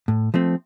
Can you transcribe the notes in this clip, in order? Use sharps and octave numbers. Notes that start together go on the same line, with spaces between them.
A2
F3 A3 C4